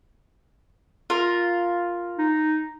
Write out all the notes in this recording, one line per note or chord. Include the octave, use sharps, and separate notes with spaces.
F4 A#4
D#4